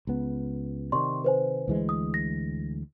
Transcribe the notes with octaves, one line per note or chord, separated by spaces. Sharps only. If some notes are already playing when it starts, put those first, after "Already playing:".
C#2 B3
C3 D#3 D5 C6 C#6
B4 C5 G#5
D2 E3 G#3
D#6
A#6